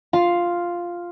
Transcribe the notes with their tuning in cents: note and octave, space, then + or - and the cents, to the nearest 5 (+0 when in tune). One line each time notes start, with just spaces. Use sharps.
F4 +0 F5 +0